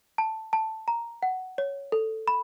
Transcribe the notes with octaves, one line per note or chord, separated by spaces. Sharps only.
A5
A5
A#5
F#5
C#5
A4
B5